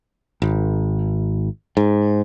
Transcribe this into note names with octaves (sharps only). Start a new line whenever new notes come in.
G#1
G#2